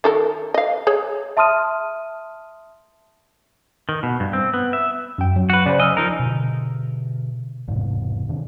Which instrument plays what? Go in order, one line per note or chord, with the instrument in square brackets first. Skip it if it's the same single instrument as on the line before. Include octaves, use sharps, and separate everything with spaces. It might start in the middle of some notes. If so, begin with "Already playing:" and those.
[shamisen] D#3 A4 A#4
D#5 F5
G#4 C#5
[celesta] E5 A5 C6 D#6 F6 D#7
[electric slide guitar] D#3
B2
G2
C4
B3
E5
[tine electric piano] F#2 G5
F#3
[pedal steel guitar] F#4 B4
[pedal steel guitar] C#3 [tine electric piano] C5 D5
[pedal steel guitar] D#5 [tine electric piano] G#5 E6 F6
[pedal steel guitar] F3 D#4 A#4
[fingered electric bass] B2 D3
E1 G#2 C3
C3 D#3 D4